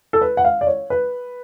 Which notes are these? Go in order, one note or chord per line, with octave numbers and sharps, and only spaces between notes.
A4
B4
F#5
F5
D5
C#5
B4